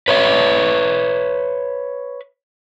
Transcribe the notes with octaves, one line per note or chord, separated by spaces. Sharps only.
B4 C#5 E5